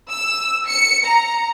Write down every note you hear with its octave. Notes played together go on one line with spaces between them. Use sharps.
E6
C#7
A#5